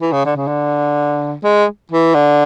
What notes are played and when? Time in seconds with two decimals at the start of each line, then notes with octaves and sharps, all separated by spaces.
0.01 E3
0.12 C#3
0.25 D3
0.36 C#3
0.48 D3
1.44 G#3
1.92 E3
2.15 D3